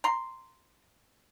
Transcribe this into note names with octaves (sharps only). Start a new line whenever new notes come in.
A#5 C6